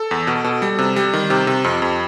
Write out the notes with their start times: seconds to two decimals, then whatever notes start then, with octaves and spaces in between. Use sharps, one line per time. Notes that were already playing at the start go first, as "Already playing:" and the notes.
Already playing: A4
0.11 E2
0.27 B2
0.44 B2
0.62 G3
0.79 C3
0.96 G3
1.13 D#3
1.30 C3 G4
1.47 C3
1.64 F2
1.82 F2